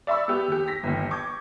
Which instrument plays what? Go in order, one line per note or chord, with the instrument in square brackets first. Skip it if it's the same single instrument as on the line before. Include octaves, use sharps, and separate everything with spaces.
[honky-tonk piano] D5 E5 B5 C#6 E6
B3 G4
D#2 G4
A#6 B6
G1 D#2
C#6 D6 G6 G#6